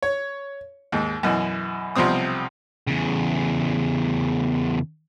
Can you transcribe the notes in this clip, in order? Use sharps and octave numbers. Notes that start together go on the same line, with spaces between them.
C#5
D#2 G#2
F#2 B2 E3
B1 C3 F3 G3 C4 D#6
E2 C#3